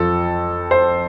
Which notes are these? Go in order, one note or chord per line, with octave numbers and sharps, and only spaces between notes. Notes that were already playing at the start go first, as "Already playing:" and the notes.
Already playing: F2 F3 A4
C5